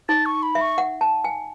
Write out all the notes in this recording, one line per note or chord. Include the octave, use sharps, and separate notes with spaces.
D#4 A6
C#6
B5
E5
C#6
F#5
A5
G#5